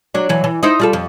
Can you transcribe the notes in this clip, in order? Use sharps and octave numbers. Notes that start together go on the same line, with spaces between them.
F#3 D4
E3 F#3
E3
D#4 E4 C5
G3 F4 A4
F2